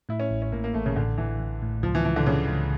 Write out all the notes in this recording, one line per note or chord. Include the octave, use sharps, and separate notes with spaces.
A2 E4
C#4
A1
C#4
A2 A#3
A#3
A1 A3
C#3
A1 D3
A1 E3
A1
A2
C#2 F3
E3
C#2 E3
D3
C#2 C#3
C#2